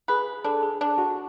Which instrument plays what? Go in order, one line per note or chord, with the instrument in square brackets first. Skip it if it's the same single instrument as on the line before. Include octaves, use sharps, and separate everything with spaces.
[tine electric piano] G#4 [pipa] B4
[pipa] D4 [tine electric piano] A4
[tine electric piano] G#4
[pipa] D4
[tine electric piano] F#4